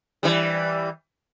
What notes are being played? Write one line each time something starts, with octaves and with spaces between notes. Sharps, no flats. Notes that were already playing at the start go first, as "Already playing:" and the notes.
E3 G3